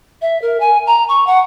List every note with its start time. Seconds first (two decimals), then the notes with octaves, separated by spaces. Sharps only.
0.21 E5
0.41 A#4
0.59 G#5
0.86 A#5
1.08 C#6
1.26 F#5